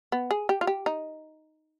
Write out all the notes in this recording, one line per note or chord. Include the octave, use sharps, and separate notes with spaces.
B3
G#4
G4
F4
G4
D#4